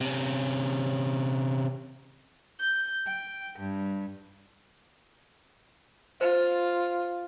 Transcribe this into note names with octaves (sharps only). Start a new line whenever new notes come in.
C3 C#4
G6
G5
G2
F4 C5